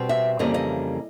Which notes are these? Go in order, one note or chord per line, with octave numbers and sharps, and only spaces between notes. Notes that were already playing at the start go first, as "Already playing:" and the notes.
Already playing: B2 G3 C4
E5
F2 C#3 E3 G3 A#3 D#5
D#5